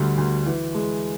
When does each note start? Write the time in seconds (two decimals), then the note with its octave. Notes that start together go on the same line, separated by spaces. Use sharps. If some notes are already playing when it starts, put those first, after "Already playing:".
Already playing: D2 D3 G3
0.18 D2
0.46 E3
0.75 G#3